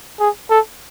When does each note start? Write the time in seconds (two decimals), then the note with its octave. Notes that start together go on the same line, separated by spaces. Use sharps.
0.20 G#4
0.50 A4